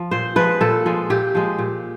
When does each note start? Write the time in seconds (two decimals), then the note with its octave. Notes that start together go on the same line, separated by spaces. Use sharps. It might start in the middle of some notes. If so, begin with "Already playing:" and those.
Already playing: F3
0.11 A#2 C5
0.36 F3 G#3 B4
0.61 A#2 A4
0.86 F3 G#3
1.10 A#2 G4
1.35 F3 G#3
1.58 A#2